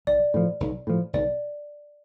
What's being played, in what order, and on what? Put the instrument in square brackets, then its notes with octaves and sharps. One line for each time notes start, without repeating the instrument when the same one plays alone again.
[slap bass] B1 [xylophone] D5
[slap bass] A2 F3
B1
A2 F3
[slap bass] B1 [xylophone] D5